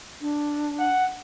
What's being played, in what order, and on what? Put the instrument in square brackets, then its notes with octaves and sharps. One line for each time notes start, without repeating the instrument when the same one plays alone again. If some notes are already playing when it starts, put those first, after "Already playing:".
[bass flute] D4
[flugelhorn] F#5